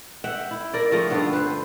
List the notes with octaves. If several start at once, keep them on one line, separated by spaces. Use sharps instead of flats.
E5 F#5 G5
E4
A#4 D5
C#3 F3 A3 C4
G2 D3 B3
B4 C5